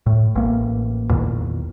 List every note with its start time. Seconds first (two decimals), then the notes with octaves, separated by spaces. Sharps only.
0.06 A2
0.35 A1 A#3
1.10 E2 A#2 D#3